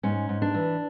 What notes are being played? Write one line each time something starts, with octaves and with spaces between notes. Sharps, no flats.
G#2 C#4
G#2
D4
E3